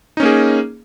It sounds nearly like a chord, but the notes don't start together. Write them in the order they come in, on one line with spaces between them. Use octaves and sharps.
D#4 C#4 A#3 G#4